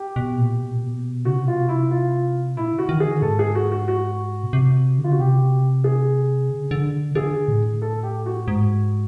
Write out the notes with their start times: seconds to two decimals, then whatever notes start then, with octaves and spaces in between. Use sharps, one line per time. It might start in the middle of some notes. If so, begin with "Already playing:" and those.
Already playing: G4
0.16 B2
0.38 A#2
0.60 B2
0.71 A#2
0.83 B2
1.25 C#3 F#4
1.36 C3
1.47 B2 F4
1.58 C3
1.69 E4
1.91 F4
2.56 A#2 E4
2.73 D3
2.78 F#4
2.89 D#3
3.00 G#4
3.06 D3
3.22 G#2 A4
3.39 G#4
3.55 F#4
3.71 F#4
3.88 F#4
4.43 B2
4.53 C3
4.98 D3
5.04 F4
5.09 C#3 F#4
5.19 C3 G4
5.84 G#4
6.50 D3
6.61 C#3
6.71 D3
7.15 D3 G#4
7.48 A2
7.82 A4
8.03 G4
8.26 F#4
8.48 G#2